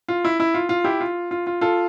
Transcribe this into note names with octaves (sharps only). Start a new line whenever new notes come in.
F4
E4
E4
F4
F4
E4 G4
F4
F4
F4
F4 A4